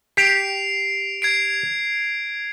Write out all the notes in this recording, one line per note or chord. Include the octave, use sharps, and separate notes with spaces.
G4 C7 D7 F7
G#6 C7 D7